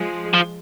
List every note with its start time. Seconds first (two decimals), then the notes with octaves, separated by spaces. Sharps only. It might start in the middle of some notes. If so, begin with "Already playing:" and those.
Already playing: F3 G#3
0.34 F3